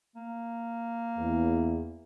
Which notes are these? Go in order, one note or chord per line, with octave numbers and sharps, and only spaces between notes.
A#3
E2